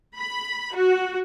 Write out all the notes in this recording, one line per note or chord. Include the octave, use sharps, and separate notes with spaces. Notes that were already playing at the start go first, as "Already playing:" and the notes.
B5
F#4